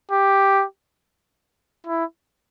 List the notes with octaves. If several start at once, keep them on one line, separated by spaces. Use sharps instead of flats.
G4
E4